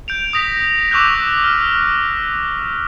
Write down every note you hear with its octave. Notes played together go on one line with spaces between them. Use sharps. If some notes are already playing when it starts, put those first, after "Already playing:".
G6 D7 F7
D#6 A#6 B6
C#6 D6 E6 F#6 G6
F6